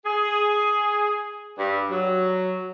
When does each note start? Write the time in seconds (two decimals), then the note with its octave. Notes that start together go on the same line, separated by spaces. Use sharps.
0.05 G#4
1.57 G2
1.90 F#3